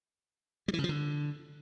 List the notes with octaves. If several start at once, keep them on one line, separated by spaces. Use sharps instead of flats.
G3
E3
C#3
F3
D3